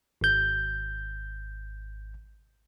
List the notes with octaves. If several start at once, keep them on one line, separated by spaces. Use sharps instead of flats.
G#1 G6